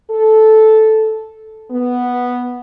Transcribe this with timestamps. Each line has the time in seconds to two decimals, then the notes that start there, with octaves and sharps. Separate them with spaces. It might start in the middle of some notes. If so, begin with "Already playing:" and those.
0.12 A4
1.71 B3